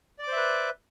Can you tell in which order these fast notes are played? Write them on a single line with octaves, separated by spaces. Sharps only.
D5 D6 C5 E5 B4